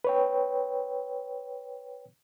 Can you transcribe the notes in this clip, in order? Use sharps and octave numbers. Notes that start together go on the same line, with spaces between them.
B4 C#5 G5